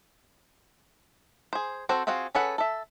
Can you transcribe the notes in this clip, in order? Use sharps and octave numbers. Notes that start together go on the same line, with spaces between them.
G#4 C5
C4 F#4 A4 C5
C4 F4 F#4 G#4 F5
C#4 G#4 A4 B4 F#5
A4 E5